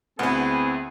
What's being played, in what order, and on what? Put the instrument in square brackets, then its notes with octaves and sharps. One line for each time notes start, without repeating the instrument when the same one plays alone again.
[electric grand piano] D2 [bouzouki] B3 E4 [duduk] C4 [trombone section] G#4